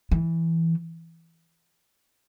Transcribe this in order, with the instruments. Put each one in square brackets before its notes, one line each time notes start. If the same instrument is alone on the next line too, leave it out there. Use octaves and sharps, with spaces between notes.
[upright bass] E3